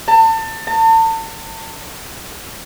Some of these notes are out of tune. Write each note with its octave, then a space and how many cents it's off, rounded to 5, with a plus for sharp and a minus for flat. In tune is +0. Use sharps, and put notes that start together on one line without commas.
A5 +30
A5 +40